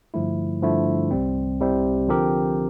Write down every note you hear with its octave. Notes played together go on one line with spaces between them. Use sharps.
G2 D3 F3 A3 E4
G2 D3 F3 A3 E4
C2 C3 G3 C4
C2 C3 G3 C4
D3 F3 C4 G4 A#4